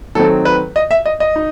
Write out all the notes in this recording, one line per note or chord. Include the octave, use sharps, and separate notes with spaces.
D#3 F#3 A3 C4 D#4 A4
B4
D#5
E5
D#5
D#5
D#4